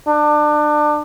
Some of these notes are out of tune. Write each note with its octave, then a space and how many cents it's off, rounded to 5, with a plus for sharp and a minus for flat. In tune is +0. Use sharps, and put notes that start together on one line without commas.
D4 +25